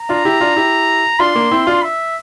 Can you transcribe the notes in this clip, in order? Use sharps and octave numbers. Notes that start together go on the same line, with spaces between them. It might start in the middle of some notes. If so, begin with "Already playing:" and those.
Already playing: A#5
D4 F4
E4 G4
D4 F4
E4 G4
D4 F4 C6
A#3 D4
C4 E4
D4 F4
E5